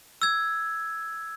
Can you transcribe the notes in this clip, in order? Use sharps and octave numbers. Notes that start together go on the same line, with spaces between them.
E6 G#6